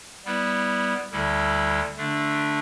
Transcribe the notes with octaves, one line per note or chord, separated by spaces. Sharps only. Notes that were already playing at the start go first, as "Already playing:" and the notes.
G3 B3 E4 B4
D2 D3 G3 E4 A4
D3 A3 D4